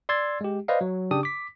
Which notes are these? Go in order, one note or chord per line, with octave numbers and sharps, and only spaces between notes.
D5 C6 E6 G#6 A6
G#3 G4
B4 C5 D5 D#5 F5
F#3
C#3 D4 G4 D#6
D6 B6